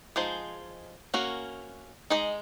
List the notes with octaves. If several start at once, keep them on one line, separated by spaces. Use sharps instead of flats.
F3 G#3 D#4 G#4 C5
A#3 C#4 F#4 A#4
G#3 D#4 G#4 D#5